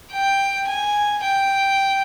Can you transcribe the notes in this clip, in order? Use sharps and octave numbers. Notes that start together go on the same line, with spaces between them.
G5
G#5
G5